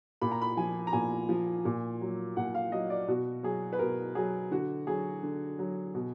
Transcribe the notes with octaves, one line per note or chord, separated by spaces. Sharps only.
A#2 B5
A#5
B5
F3 G#5
A#5
A#2 G#5
F3
A#2
F#3
A#2 F#5
F5
F#3 D#5
D5
B2 F#4
F#3 G#4
B4
B2 A#4
F#3 G#4
D3 F#4
F#3 G#4
D3
F#3
B2